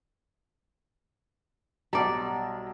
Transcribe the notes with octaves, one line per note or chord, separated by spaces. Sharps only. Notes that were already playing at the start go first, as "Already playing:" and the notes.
B1 G3 D5 A5 A#5